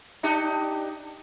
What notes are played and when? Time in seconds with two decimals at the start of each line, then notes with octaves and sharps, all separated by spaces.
0.23 D4 D#4 G4